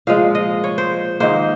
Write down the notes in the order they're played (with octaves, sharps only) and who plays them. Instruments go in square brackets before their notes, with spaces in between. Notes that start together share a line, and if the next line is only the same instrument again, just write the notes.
[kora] A#2 F3 G#3 F5
D#5
C#5
C5
G#2 D#3 A#3 C5